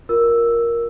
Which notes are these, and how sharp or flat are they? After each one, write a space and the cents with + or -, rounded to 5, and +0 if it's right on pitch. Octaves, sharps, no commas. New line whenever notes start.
F4 +0 A#4 +5 E6 +0